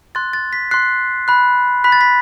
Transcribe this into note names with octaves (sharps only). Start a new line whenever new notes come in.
C6 F#6 A6
A6
B6
C6 F#6 C7
B5 F#6
B5 F#6 B6
A6
B6